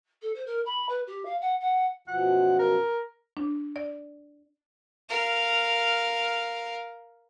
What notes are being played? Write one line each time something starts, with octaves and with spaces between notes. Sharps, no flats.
A4
C5
A#4
B5
B4
G4
F5
F#5
F#5
F#2 B2 F3 F#5
A#4
D4
D5
A#4 F5